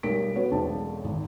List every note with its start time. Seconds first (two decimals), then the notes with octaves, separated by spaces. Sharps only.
0.03 B1 G3 A#4 B6 D7
0.36 B3 F#4 B4 C#5
0.52 E1 B1 C4 A5
1.04 G#1